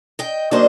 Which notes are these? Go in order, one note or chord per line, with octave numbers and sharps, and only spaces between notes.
D#5 G5
D#3 F#3 A#3 D4 C5 D#5